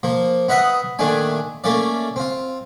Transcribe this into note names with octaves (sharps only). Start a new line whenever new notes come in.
F3 A#3
B3 D#4 B4 D#5 E5 F#5
A#2 D#3 A3 D4 G#5
A3 A#3 C#4 D5
C4 F4